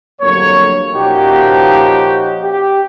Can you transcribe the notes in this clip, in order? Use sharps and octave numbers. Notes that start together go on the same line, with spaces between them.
G1 F2 F#3 A#3 C#5
A#2 F3 C#4 D#4 F#4 G4
G4